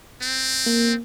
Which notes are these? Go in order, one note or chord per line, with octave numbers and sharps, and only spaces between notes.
C4
A#3